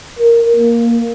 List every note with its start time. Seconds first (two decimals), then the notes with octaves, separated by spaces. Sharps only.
0.19 A#4
0.56 A#3